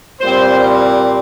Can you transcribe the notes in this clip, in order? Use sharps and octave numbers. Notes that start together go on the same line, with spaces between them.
A#2 G3 C4 C5